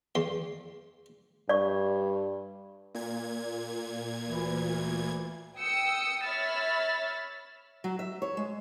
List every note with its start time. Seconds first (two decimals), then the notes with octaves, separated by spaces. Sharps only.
0.15 E2 C6
1.49 G2 D5 C#6
2.95 A#2 G#6
4.27 D2 E3
5.58 G5 D#6 E6 C#7
6.26 C#5 E5 B5 E6 F6 A6
7.84 F#3
7.99 E5
8.22 C#5
8.37 G#3